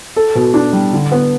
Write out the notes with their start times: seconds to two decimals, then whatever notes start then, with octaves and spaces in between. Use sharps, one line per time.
0.16 A4
0.35 B2
0.54 D4
0.73 G3
0.93 D3
1.12 B3